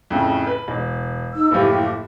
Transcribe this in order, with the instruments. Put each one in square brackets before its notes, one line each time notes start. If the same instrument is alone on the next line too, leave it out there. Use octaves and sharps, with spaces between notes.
[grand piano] F2 A2 C#3
B4
E1
[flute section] D#4 E6
[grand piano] F#1 A2 F3 [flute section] G4